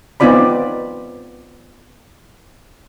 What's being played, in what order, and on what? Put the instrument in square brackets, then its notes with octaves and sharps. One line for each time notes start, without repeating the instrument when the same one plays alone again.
[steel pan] B3 C4 D#4 F4 D5 B5